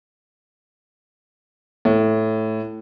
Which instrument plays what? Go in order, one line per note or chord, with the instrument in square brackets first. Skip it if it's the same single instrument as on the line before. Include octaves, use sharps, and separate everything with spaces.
[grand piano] A2